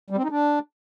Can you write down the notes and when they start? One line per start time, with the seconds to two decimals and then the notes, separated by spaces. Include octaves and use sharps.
0.10 G3
0.17 C4
0.24 D#4
0.30 D4